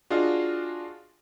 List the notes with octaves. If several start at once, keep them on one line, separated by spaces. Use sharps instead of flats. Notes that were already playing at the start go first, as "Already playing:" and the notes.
D4 F4 F#4 G#4 D#5 F5